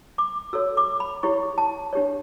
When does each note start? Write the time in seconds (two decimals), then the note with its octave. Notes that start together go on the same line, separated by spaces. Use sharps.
0.18 D6
0.53 F#4 A4 C#5 E6
0.77 D6
1.00 B5
1.23 E4 G4 C#5 C#6
1.58 A5
1.93 D4 G4 C#5